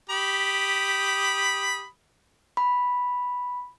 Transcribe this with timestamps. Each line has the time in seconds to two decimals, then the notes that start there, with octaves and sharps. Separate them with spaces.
0.10 G4 B5 D#6
2.57 B5